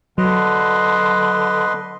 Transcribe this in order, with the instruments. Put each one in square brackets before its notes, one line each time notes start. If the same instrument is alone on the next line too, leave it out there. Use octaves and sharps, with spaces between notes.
[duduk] D3 [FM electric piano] F#3 [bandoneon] B4 D#5 C6